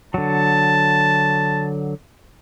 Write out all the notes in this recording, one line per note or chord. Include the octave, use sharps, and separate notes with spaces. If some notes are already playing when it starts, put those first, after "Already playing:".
D3 F#3 A5